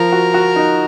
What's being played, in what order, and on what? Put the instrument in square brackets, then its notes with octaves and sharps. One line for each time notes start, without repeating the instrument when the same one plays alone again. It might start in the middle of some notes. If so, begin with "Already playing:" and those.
Already playing: [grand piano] F3 [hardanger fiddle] A#4
[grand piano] F#4
F#4
D#4